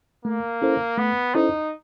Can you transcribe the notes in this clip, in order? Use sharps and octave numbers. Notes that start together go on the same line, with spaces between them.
A3 A#3
C#4 E4 A4 C5
A3 B3
C#4 D#4 E4 A4 C5